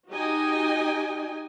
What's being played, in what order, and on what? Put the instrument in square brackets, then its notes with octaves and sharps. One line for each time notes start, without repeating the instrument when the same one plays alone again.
[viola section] D#4 F#4 G4 D#5 G5 G#5